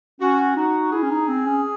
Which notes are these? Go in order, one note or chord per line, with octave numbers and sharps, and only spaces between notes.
C#4 F#4
D#4 F#4
E4 G#4
C#4
D#4
C4
C#4